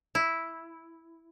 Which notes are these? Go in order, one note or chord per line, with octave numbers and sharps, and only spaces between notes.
E4